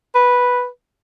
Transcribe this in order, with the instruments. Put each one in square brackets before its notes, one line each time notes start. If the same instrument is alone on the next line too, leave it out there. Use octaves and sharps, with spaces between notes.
[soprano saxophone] B4